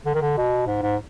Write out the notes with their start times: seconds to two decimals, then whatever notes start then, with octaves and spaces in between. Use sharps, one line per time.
0.06 D3
0.15 D#3
0.22 D3
0.37 B2
0.67 G#2
0.82 G#2